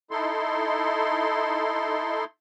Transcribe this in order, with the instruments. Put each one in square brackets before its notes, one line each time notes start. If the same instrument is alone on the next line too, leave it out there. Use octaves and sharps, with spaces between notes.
[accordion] D#4 E4 A4 C6